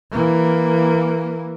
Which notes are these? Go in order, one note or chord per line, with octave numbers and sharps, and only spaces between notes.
E3 A#3